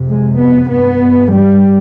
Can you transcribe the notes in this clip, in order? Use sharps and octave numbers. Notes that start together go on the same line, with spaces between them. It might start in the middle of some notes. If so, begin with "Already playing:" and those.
Already playing: F2 C3
G#3
B3
G2 B3
G3